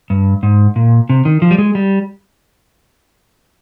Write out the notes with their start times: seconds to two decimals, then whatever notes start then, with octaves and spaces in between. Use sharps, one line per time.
0.10 G2
0.43 G#2
0.76 A#2
1.09 C3
1.25 D#3
1.42 F3
1.51 G3
1.58 G#3
1.75 G3